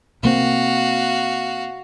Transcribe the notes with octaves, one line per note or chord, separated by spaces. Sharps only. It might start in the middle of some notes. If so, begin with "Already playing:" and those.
C3 A#3 C4 F#4 F5